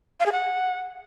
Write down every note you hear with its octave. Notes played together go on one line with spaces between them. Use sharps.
F5
G#4
F#5